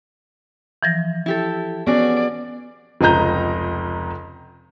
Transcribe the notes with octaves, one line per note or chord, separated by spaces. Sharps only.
E3 F3 A#6
E4 G4 A4
B3 C#4 F#4 G#4 D5
F1 C#2 D#5 A#5 G6